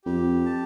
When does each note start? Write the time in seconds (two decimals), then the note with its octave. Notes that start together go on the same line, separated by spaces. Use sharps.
0.05 F2 G4
0.46 A5